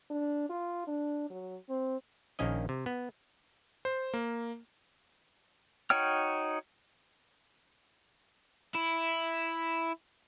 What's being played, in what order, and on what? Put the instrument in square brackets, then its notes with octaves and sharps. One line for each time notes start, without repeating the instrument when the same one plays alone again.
[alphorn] D4
F4
D4
F#3
C4
[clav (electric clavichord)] A#1 D#3 A#3 C#4 D#5
C3
B3
[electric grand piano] C5
A#3
[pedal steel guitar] D#4 F#4 C#5 G5 F6
[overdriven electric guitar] E4